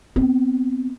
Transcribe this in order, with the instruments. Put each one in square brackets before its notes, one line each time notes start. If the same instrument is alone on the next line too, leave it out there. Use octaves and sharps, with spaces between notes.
[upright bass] B3 C4